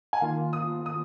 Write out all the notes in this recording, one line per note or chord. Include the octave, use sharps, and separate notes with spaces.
G#5
D#3 A#3 F4 F5
D#6
D#6